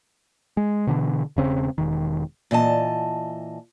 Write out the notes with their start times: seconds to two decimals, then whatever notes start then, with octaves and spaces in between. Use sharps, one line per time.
0.57 G#3
0.87 B2 D3 E3
1.36 E1 C#3 C4
1.78 E1 D#3
2.51 A#2 E3 D#5 A5